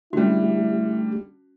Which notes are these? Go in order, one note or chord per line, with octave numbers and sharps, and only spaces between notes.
D3 G3 A3 C#4 E4 F#4 G4